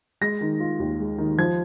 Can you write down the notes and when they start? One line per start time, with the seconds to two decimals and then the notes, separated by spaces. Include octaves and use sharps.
0.21 G#3 A#6
0.41 D#3
0.60 F4
0.80 D#2
1.00 G#3
1.18 D#3
1.38 F3 G#6